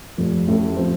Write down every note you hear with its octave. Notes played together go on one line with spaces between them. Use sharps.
F1 F2 F3
A1 A2 A3
F3 C4